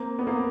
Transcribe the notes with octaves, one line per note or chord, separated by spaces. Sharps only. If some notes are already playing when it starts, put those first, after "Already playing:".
Already playing: A#3 C4
B3
A#3 C4